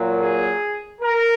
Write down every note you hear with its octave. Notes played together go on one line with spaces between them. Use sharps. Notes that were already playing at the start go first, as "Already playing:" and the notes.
Already playing: A#2 F#3 A#3
G#4
A#4